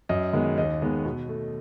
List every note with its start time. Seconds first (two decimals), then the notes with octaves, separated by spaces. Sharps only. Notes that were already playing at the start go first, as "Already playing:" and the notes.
0.09 F#2 D#5
0.33 D#3 G#3 B3
0.58 D#2 D#5
0.82 D#3 G#3 B3
1.05 B2
1.29 A3